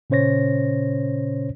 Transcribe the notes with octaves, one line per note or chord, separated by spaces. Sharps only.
A#2 C#3 C#4 C5 C#5 A#6